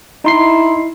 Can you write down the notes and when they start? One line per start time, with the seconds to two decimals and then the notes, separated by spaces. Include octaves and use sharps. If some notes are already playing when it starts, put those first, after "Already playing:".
0.25 D#4 E4 C6 C7